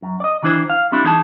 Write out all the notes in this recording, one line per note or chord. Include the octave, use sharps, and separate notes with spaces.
F#2
D5 D#5
D#3 E3 D4 E4 C5
F5
G3 C4 D4 E4
E3 D#4 G#4 A5